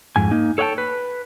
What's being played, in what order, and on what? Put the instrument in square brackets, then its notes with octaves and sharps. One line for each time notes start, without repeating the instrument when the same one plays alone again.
[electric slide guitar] F2 G#2 G#5
A#3 D#4
A4 C#5 D#5 F#5 G5 A5
B4